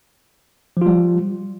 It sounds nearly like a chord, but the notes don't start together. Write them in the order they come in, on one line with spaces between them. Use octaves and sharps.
F3 F4 G3